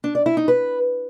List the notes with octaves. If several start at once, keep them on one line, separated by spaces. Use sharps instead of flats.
D4
D5
E4
D#4
B4